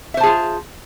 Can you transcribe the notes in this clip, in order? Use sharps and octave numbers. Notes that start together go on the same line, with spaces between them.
F4 G#4 C5 E5 A5